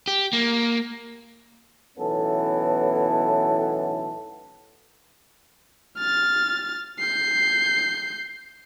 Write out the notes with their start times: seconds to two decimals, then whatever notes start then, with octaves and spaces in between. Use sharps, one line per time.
0.08 G4
0.33 A#3
1.98 B1 A2 E3 B3 C#4 A4
5.98 F6 A6
6.99 G6 C7